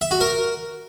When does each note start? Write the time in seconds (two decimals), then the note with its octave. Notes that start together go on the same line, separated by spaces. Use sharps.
0.01 E5
0.11 F#4
0.21 A#4